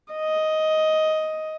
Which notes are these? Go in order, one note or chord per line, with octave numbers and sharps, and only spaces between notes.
D#5